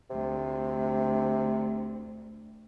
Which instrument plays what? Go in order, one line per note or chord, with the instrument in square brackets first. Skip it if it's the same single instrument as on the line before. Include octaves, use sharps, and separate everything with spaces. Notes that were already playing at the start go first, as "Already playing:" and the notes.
[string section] D2 [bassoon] C3